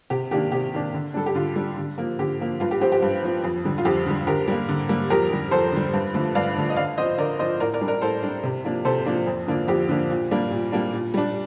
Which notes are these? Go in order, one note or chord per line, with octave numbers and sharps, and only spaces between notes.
C3 G4
D#3 A#3 D4 G4
C3 G4
D#3 A#3 D4
D3
G3 D4 A4
G4
D3 F4
G3 D4
D3
F3 A#3
D3 G4
F3 A#3
G2 F4
G4
F3 C4 G4
G4
G2
F3 C4
F2
D3 G3
F4
F2 G4
D3 G3
D3 G4 A#4
G3 A#3
D3
G3 A#3
F2 G4 A#4
D3 G3
F2 A4 C5
D3 G3
G2
D3 F3 A3
G2 D5 F5
D3 F3 A3
D#5
D3 D5 F5
F3 C4 C5 D#5
D3 A#4 D5
F3 C4 C5 D#5
A2 A#4 D5
A#4 D5
G3 D4
A#4 D5
A2 A4 C5
G3 D4
C3
F3 A#3 D4
C3 A4 C5
F3 A#3 D4
F2
D3 F3 A#3 D4
F2 G4
D3 F3 A#3 D4
A#2
G3 A#3 D4
A#2
G3 A#3 D4
A#2
G3 D4